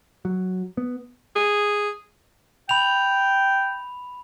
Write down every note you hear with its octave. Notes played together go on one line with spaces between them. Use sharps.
F#3
B3
G#4
G5 B5 F7